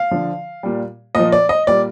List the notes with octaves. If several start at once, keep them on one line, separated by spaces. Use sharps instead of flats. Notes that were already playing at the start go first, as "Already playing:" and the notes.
Already playing: F5
D3 F3
A#2 G3
A#2 F3 D#5
D5
D#5
A#2 G3 D5